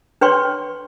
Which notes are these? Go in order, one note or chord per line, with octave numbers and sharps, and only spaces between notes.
D4 B4 C#5 G5 C6 C#6